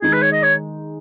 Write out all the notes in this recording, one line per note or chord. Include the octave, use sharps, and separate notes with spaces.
D#3 G#3 D#4 G#4
B4
C#5
D#5
C#5